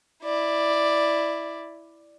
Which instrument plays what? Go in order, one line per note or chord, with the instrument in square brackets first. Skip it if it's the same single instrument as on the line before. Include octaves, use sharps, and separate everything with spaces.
[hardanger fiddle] E4 D5